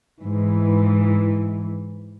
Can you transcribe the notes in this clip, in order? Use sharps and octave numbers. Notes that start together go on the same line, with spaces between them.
G#2 E3